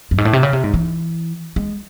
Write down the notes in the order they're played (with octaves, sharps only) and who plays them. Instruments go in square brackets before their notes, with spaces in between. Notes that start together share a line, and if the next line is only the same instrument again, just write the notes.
[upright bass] F#2
G#2
A2
C3
C#3
C3
G#2
E3
G#3